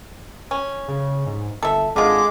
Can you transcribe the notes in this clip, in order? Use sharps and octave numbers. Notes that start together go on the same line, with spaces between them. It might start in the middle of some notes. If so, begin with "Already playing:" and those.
C#4
C#3
G#2
G1 A4 E5
G#1 D3 G#3 F4 D6